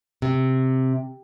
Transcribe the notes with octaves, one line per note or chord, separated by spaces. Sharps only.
C3